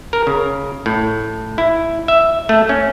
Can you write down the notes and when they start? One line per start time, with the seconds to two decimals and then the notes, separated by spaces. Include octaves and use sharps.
0.13 A#4
0.27 C#3
0.86 A2
1.58 E4
2.08 E5
2.49 A3
2.69 C#4